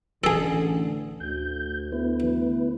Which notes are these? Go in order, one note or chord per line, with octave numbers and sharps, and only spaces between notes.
A1 D3 G#4 A4
D2 G6
B3 E4 B4